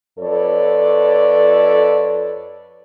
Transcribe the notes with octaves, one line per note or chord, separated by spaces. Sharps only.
F2 A4 B4 C#5 D5